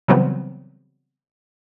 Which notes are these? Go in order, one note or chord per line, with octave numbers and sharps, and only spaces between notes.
C#3 E3 F#3 G3 B3 C4